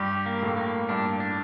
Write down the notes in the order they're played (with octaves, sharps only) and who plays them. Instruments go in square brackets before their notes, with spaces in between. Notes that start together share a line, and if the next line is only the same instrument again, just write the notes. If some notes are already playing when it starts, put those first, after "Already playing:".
Already playing: [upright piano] G2 [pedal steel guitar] G4
[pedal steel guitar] A#3
[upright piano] A2
[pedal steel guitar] A#3
[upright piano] G2 [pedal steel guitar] D4
[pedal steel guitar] D4